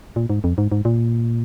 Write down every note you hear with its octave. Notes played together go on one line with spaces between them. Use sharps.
A#2
G#2
F2
G#2
G#2
A#2